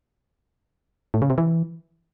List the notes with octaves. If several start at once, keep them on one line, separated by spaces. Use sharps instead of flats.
A2
C#3
C3
E3